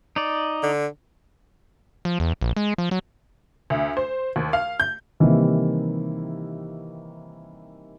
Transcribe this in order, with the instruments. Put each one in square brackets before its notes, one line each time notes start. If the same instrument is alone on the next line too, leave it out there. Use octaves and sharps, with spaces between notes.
[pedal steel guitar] D#4 D5
[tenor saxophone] D3
[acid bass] F3
E2
A#1
G#3
F3
F#3
[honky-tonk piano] D2
C5
D#2
F5
G6
[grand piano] C3 D#3 E3 G3 A#3